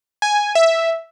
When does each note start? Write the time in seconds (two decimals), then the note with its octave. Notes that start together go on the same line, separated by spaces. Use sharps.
0.22 G#5
0.55 E5